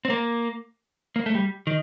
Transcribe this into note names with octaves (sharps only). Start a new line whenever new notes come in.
C4
A#3
A#3
A3
G3
D#3